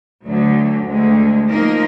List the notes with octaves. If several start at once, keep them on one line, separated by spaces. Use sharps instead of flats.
D2 D3 F#3
D2 D3 G#3
F3 A#3 D#4 A#4